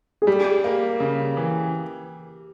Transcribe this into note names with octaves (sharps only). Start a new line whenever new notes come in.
G#4
G3 G4
A#3
C#3
E3